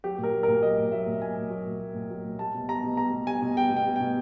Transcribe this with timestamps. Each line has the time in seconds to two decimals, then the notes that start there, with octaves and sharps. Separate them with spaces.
0.04 F#3 G4
0.18 A#2
0.23 A#4
0.33 F#3
0.43 A#2 A#4
0.63 F#3 D#5
0.78 A#2
0.92 F#3 E5
1.07 A#2
1.22 F#3 G#5
1.36 A#2
1.50 F#3
1.66 A#2
1.80 F#3
1.95 A#2
2.10 F#3
2.24 A#2
2.39 G3 A5
2.54 B2
2.68 G3 A#5
2.83 B2
2.97 G3 A#5
3.12 B2
3.27 G3 G#5
3.42 B2
3.57 G3 G5
3.71 B2
3.77 G5
3.86 G3
3.96 B2 G5